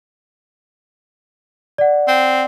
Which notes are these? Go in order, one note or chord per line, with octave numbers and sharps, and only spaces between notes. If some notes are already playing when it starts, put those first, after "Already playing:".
D5 F#5
C4